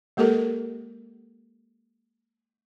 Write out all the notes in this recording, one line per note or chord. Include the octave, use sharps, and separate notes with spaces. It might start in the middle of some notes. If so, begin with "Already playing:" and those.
G#3 A#3 G4 A4 A#4